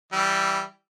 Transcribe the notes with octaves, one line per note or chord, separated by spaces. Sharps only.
E3 G3 E5